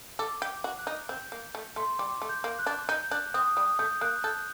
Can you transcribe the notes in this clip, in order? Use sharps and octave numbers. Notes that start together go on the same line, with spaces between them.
A4 D6
G4
F#4
F#6
D#4
C4 G6
A#3
A3
A3 C6
G3 D6
A3
G6
A#3
F#6
D4
D#4 G6
D4 F#6
C4 D#6
G3 D#6
A3 G6
A#3 F#6
A4 G6